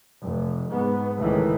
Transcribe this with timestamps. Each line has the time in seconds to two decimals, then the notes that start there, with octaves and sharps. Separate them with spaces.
0.23 F1
0.71 G#2 B3
1.19 C#2 A2 D#3 E3